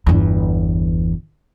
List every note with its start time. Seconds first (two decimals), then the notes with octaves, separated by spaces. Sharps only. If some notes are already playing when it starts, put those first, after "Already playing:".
0.06 G1 E2